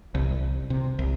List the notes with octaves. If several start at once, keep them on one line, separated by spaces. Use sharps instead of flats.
C2
C3
C2